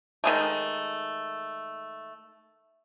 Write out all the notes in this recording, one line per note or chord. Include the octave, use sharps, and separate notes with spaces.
D#3 G#3 A3